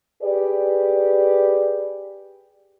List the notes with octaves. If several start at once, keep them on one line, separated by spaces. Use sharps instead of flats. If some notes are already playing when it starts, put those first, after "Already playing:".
G4 G#4 B4 D5